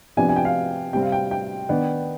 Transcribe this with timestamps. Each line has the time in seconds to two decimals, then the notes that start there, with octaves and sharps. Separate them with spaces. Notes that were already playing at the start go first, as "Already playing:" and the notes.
0.17 C3 F3 B3 D4 G#5
0.29 G#5
0.36 G5
0.45 F5
0.93 C3 G3 C4 G5
1.02 F5
1.12 G5
1.31 G5
1.69 D#3 B3 D4